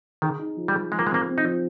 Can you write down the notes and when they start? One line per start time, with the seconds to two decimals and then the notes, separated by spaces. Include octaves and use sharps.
0.22 D#3 G#4
0.39 D#4
0.57 F3
0.68 G3
0.75 G#4
0.91 F3 G#3
0.99 A#3
1.07 G#3 C4
1.14 A#3
1.27 C4
1.38 D#4
1.43 F3